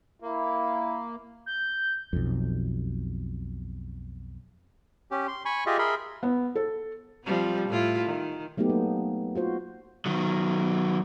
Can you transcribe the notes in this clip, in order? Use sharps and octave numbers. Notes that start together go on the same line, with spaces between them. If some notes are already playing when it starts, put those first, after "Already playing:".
A#3 E4
G6
B1 F2
C#4 G4
C6
G#5 B5 C#6
F4 G4 G#4 D#5 E5
G#4 A#4 E5 B5 C6
B3
A4
F3 G3 C4
A2 E4 F4
D#3
F#3 A3 B3 D#4 G4
A#3
F4 F#4 C5
D#3 F#3